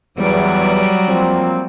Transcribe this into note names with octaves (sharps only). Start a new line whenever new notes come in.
E2 F#3 G3
F3 A#3 C4